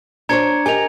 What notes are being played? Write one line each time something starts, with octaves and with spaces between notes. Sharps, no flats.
D4 C5 C#5 A#5 G#6 C#7
G4 A#4 D#5 G#5 F7